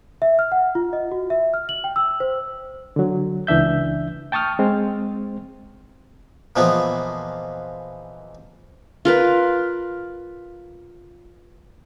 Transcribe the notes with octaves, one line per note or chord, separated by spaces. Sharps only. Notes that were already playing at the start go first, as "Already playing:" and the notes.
E5
F6
F#5
F4
D#5
F#4
E5
F6
F#7
G5
E6
C5
D3 F#3
C#2 E3 D4 E5 G6
G5 A5 C#6 D#6 F6
G#3 C4 C5
A#2 E3 F3 G#3 A#3 B3
F4 A#4 B4